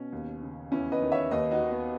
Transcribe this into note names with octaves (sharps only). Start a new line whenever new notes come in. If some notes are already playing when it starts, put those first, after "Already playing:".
Already playing: B2 C#4
D#2
C#3
E2 C#4 E4
B4 D#5
D#3
C#5 E5
D#2 B4 D#5
D#4 F#4
D#3
B3 D#4